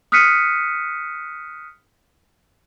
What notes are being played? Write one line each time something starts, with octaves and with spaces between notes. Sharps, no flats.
D#6 F6 F#6 B6 C#7 D#7